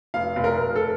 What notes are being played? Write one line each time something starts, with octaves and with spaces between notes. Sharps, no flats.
F1 F5
F1
A#4
F1
A4